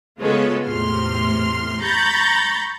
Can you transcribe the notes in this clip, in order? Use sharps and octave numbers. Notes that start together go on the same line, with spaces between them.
C#3 G#3 B3 F4 A4 C#5
E2 A2 C3 C6 F6
A#5 B5 C#6 G6 A6